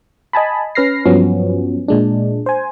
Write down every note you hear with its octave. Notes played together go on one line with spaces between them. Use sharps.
D#5 G#5 A5 B5
C#4 B4 F6 A#6 C7
G2 F3 F#3 B3 C#4
A#2 G#3 D4
C5 G#5